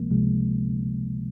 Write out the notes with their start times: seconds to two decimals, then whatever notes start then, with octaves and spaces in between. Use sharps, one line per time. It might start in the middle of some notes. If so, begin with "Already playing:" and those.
Already playing: C#2 C3 F3 G#3 A#3
0.11 C#2 C3 F3 G#3